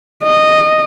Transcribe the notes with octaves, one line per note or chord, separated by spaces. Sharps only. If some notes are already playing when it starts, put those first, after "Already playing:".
D#5